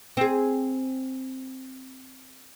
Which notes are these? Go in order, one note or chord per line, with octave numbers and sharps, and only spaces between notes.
C4 G#4